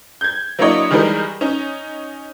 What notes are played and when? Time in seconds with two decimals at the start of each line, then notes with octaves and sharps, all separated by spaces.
0.21 G6 G#6
0.59 F#3 A#3 D4 E4 C#5 D#5
0.91 D#3 E3 G3 G#3 D#4 A#4
1.41 C#4 D#4